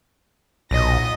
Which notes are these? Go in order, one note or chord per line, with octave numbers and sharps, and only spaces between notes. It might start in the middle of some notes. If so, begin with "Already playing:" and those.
B1 A#2 D#5 A#6